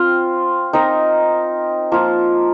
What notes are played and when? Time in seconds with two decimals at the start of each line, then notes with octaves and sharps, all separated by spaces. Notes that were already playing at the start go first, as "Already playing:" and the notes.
Already playing: C4 F4 C5 F5
0.73 C4 D#4 A#4 D#5
1.92 F3 A#3 F4